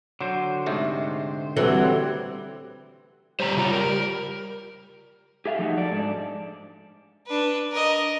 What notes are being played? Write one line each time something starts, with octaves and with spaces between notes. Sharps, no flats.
D3 F#3 C5
G#2 C3 A3
C3 E3 F#3 G3 A3 C4
G3 C5 C#5 A#5
C#3 F4 A#5
A#4
G4 G#4 E5 F5
F3 A3 D#4 F#4
A4 D5
G#2 D4
D4 B4
A#4 D#5